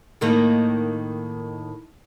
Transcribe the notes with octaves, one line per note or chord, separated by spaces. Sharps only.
A2 D#3 A#3